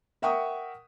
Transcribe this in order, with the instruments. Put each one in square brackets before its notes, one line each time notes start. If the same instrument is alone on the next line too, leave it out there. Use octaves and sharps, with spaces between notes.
[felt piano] A#4 E5 F#5 G5 C#6 D#6